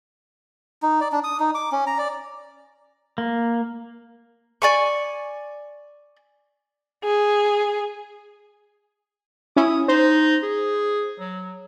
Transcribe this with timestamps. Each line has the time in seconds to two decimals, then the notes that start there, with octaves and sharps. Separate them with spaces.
0.82 D#4
1.01 D5
1.12 D4
1.24 D#6
1.40 D#4
1.55 D6
1.72 C#4
1.87 A#5
1.98 D5
3.18 A#3
4.62 D5 G#5 C#6
7.04 G#4
9.56 C#4 E4 D#6
9.88 D#4 C5
10.43 G#4
11.19 F#3